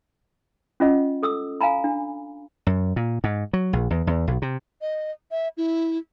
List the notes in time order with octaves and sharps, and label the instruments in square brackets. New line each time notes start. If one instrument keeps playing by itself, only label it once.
[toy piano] C#4 F4 D#5 F#5
A4 D#6 E6
F5 G#5 A#5 B5
D4
[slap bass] F#2
A#2
G#2
F#3
A#1
E2
E2
B1
C3
[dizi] D#5
E5
E4